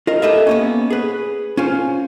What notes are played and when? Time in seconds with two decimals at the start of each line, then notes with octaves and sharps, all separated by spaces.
0.07 F4 A#4 D#5
0.22 G4 A4 B4 D#5 E5
0.47 A#3 B3 C#4
0.90 G#4 B4
1.57 C#4 F4 C5